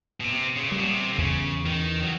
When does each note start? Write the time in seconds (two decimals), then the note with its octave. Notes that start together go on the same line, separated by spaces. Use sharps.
0.20 B2
0.24 C3 B3
0.57 C#3
0.68 A#2 G3
0.78 B2
0.87 C3
1.13 D3
1.18 E2 C#3
1.65 D#3 E3
2.03 F#3